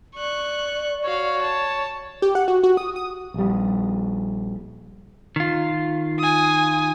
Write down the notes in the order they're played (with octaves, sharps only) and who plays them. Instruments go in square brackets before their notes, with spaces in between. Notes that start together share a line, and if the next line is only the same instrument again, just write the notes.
[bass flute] D5 [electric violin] C#6 F#6
[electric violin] F#4 F5 [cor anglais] C#5
[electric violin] A5
[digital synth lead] G4
F#5
F#4
F#4
D#6
D#6
[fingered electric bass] A#1 G3
[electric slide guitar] D#3 F4
[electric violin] G#5 D#6